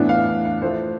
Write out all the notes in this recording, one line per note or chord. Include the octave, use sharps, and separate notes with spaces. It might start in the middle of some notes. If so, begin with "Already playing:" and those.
Already playing: A2 E3 B3 D4
F5
F5
F3 A3 E4 C5